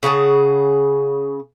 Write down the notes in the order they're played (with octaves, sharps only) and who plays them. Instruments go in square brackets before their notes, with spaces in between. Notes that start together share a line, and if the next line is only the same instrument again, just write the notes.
[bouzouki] C#3 G#4 F#5 A5